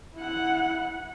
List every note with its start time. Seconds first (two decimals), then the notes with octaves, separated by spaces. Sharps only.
0.15 E4 F#5